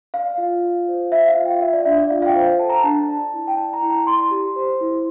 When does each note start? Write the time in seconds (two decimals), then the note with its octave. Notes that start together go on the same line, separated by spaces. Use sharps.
0.14 D5 F5
0.38 F4
0.63 F4
0.88 C5
1.12 C5 E5
1.28 F5
1.36 F4
1.45 G5
1.61 D5 E5
1.73 D5
1.85 D4 E5
1.98 D5
2.10 F4 F5
2.22 F5
2.26 G5
2.35 C5
2.59 A4 A5
2.69 A#5
2.79 D4 A5
3.08 D5
3.34 E4
3.47 G5
3.57 D5 A5
3.73 A#5
3.82 E4
3.90 A#5
4.07 D5 C6
4.31 G4
4.56 C5
4.81 E4